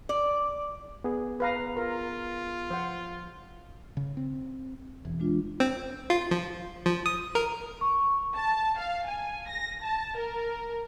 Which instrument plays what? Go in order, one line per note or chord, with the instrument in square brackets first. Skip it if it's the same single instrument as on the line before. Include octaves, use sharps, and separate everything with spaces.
[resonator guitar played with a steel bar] D5
[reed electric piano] B3 G#4
[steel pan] B4 F5 A#5
[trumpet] F4 [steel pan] A#4
[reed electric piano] F3 [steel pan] C5 F#5
[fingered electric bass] C#3
C4
[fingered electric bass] E1 [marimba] E3
[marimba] G#3 D4 F4
[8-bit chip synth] C4
F4
F3
F3
D#6
A#4
[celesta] C#6
[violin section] A5
F5
G#5
A#6
A5
A#4